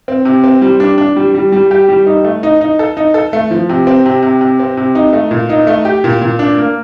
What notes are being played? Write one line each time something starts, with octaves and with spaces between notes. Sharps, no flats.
C4
C3
C4
G3
D4
D4
G3
G3
G3
G4
G3
D#4
A3
D#4
D#4
A4
D#4
A4
A3
F3
C3
C4
C3
C3
C3
C4
C3
D#4
A3
A#2
D#4
A3
G4
A#2
A#2
D4
A#3